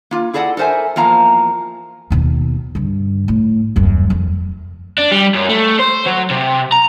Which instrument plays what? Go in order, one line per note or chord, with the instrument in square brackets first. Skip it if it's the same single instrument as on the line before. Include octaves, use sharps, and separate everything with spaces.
[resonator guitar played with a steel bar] A#3 F4
E4 G#4 A4 D5 D#5 F#5
A4 A#4 C5 E5 G#5
E2 F3 A#3 F5 A#5
[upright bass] D#2 B2
G2 D3
A2
D#1 F#2
F2
[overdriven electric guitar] D4
G3
F#2
A3
C5
F#3
C3
A#5